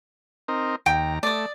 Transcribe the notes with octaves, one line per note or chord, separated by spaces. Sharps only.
C4 D#4 A#4
D#2 G5 A#5
A3 D5 D#6